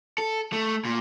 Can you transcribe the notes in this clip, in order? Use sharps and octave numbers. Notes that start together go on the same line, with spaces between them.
A4
A3
A#2